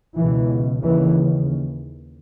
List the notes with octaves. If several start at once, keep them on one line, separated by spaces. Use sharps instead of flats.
C#2 B2 E3
D#2 C#3 E3